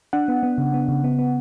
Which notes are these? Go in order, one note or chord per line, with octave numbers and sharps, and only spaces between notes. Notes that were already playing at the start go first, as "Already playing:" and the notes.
D4 F#5
B3
B3
C#3
B3
C#3
B3
B3